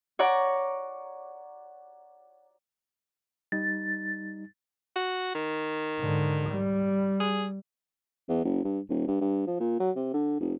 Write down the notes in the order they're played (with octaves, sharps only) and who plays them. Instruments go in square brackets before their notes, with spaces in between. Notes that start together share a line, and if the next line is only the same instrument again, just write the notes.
[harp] C#5 D5 F#5 A#5 C#6 D6
[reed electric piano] G3 D#4 [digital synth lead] A6
[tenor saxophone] F#4
D#3
[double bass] G#2 D3
G3
[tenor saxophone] G#4
[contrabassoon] E2
F#1
G2
D#1
G2
G2
F3
A#2
F#3
C3
D3
F1